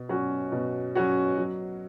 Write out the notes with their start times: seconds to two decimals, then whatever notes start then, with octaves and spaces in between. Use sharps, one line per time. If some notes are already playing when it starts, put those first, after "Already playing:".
Already playing: B2
0.09 F#3 C#4 F#4
0.52 B2
0.95 F#3 C#4 F#4
1.37 F#3